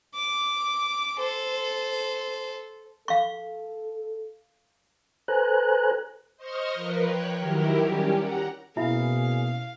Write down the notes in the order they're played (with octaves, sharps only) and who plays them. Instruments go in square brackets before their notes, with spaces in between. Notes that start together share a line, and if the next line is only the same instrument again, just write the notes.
[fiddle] D6
A4 C5
[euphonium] A4 [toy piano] F5 C#6
[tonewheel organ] A4 B4 C5 G#5 A#5 F#6
[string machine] C5 D#5 C6 C#6 D#6 F6
F3 A#4 B4
C#5 G5 F#6
D#3 F#3 E4 G4 A#4
G3 C#4 G4
F#5 A#5
[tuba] B2 [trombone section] A#3 C#4 G#4 [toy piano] E4 E5 B5 [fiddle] F5